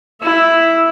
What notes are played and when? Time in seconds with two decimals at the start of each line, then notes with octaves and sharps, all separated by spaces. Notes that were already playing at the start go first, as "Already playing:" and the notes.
0.22 E4 E5